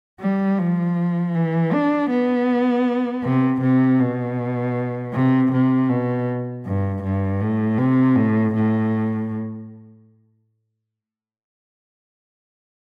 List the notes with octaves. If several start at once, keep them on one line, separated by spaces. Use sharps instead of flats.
G3
F3
E3
D4
B3
C3
C3
B2
C3
C3
B2
G2
G2
A2
C3
A2
A2